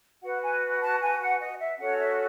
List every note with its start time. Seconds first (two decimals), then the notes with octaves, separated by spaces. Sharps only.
0.23 F#4 B4 F#5
0.42 G#5
0.82 A5
1.01 G#5
1.20 F#5
1.40 D#5
1.59 E5
1.79 C#4 F#4 A4 C#5 F#5
1.98 E5